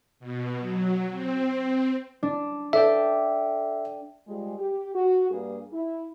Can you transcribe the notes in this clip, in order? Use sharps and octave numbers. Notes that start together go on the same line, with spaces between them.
B2
F#3
C4
D4
A4 D5 E5 G5
F3 G3 G#3
G4
F#4
G2 A#3 G#4
E4